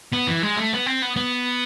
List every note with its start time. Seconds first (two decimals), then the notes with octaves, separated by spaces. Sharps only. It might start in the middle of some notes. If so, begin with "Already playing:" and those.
0.13 B3
0.28 E3
0.43 G#3
0.57 A3
0.73 B3
0.86 C4
1.02 B3
1.16 B3